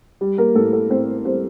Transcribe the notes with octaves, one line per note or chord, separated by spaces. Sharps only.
G3
A#3 A#4
A2 A4
A4
A2 C4 C5
G3 C4 C5